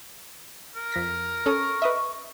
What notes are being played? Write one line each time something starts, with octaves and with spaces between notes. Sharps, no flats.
A#4
F2 A#6 B6
C#4 A4 C#6 D#6
B4 D#5 E5